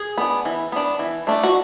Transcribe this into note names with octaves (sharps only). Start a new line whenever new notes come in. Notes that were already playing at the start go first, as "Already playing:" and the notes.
Already playing: G#4
B3 D4
E3
B3 D4
E3
A3 D4
F#4